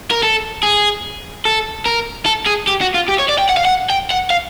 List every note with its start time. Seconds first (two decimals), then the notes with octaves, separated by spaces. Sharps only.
0.11 A#4
0.23 A4
0.63 G#4
1.45 A4
1.86 A#4
2.26 A4
2.46 G#4
2.67 G4
2.81 F#4
2.94 F4
3.08 G4
3.18 C#5
3.28 D5
3.38 G5
3.49 F#5
3.57 F5
3.65 F#5
3.90 G5
4.10 F#5
4.30 F5